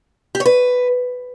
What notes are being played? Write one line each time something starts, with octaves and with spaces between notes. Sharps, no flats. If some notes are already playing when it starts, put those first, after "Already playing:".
G4
C#5
B4